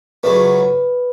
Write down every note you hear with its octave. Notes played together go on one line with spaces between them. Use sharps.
C#2 C#3 F#3 A3 B4